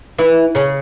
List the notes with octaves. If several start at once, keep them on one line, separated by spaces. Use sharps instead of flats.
E3 E4
C#3 C#4